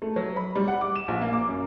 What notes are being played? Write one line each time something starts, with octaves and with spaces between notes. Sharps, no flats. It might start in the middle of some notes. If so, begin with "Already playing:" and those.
A3
F#3
B5
G3
F#5
D6
E7
A#1
A#3
D6
F#2